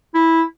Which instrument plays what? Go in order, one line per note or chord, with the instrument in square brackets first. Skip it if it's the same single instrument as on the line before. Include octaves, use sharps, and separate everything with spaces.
[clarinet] E4